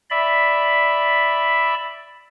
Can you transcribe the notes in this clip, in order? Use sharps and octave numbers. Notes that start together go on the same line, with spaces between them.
D5 E5 B5